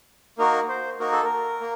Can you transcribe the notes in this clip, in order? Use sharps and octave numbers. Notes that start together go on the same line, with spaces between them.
A#3 D#4 F#4 A#4
C5
A#3 D#4 F#4 A#4
A4
A#4
A#3